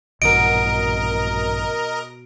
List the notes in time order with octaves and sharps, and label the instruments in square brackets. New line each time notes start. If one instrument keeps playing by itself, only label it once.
[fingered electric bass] A#1 G2 E3 [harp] B2 [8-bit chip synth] A#4 D#5 [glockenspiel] D7